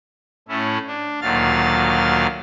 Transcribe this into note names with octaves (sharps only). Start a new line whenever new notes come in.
A2 A3 C#4 E4
D4
D2 A#2 D#3 F#3 F5 A6